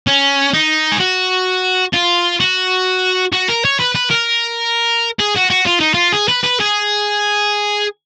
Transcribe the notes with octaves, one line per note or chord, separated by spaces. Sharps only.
C#4
D#4
G#4
F#4
F4
F#4
F#4
A#4
C#5
B4
B4
A#4
G#4
F#4
F#4
F4
D#4
F4
G#4
B4
B4
G#4